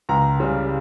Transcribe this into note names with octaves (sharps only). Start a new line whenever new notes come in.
C#2 A#5
C#3 G3